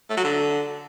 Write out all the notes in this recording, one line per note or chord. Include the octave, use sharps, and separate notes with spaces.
A3
F#3
D3